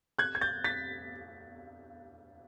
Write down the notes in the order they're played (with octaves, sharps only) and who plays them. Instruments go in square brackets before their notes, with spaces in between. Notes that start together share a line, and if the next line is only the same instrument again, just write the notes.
[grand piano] F#6 G#6
G#6
G6 A6
A6 B6